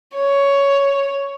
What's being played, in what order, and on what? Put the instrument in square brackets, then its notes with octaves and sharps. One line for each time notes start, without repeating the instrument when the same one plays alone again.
[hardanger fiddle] C#5